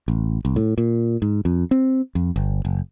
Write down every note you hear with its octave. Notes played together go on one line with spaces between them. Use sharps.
A1
C2
A2
A#2
G#2
F2
C4
F2
G1
F#1